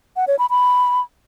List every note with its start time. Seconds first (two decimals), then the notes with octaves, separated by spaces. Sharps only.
0.16 F#5
0.28 C#5
0.39 B5
0.50 B5